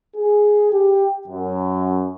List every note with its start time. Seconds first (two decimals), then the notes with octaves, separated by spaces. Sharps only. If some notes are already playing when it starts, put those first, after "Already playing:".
0.16 G#4
0.72 G4
1.27 F#2